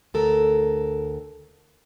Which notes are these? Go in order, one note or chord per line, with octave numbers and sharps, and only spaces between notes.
D2 A4 A#4